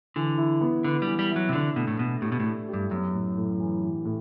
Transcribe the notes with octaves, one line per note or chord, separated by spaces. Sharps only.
D3 E3
E4
B3
D3 B4
E3 G3
G3
F#3 E4
C3
D3 D4
B2 A3
A2
B2 A3
A2 G4
B2
A2 A3
G2 G4
F#2 B3
A2
A2
E3
E3
A2